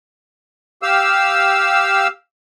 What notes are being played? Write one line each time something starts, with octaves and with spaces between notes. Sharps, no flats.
G4 F5 E6